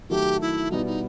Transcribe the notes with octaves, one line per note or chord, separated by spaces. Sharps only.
D#3 F#3 A3 G4
E4
B2 G3 B3 D#4 E4
D#4